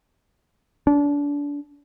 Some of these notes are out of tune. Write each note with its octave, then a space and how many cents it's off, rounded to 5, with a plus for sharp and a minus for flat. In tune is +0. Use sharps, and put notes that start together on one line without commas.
D4 -30